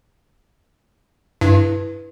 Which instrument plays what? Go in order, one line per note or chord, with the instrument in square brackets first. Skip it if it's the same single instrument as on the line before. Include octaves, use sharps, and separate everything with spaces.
[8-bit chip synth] G2 [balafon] E4 B4